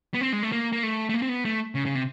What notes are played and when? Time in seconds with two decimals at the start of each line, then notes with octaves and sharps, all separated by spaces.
0.14 B3
0.21 C4
0.33 G#3
0.43 A3
0.52 A#3
0.72 A#3
0.83 A3
1.09 A3
1.14 A#3
1.22 C4
1.29 B3
1.45 A3
1.75 C#3
1.86 C#3
1.95 C3